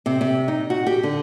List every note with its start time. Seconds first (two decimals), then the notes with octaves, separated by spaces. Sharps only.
0.06 C3
0.21 C3
0.48 D#4
0.70 F#4
0.86 G4
1.03 D3